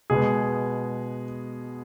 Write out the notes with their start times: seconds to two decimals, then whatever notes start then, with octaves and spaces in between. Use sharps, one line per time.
0.10 B2 G#3 B3 G#4